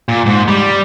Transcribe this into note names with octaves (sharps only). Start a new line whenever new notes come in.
A#2
G#2
G3